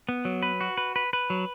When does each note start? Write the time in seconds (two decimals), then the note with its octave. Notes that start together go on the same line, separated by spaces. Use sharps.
0.09 B3
0.25 F#3
0.43 B4
0.61 F#4
0.77 B4
0.96 B4
1.13 B4
1.30 F#3